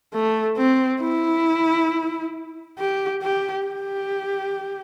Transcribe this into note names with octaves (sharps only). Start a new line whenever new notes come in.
A3
C4
E4
G4
G4
G4